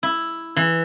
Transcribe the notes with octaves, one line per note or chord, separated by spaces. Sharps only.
E4
E3